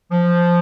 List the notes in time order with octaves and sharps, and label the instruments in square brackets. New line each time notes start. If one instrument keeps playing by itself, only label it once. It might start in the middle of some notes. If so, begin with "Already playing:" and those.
[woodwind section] F3